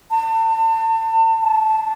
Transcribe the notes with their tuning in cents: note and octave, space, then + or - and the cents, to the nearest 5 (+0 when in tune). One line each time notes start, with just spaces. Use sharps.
A5 +35
A5 -10